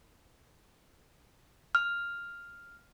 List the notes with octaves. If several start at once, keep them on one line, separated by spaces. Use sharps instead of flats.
F6